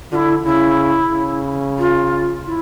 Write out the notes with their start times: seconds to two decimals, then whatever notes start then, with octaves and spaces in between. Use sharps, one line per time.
0.12 D3 E4 F4
0.44 C#3 E4
1.11 C#3
1.78 F4
2.45 E4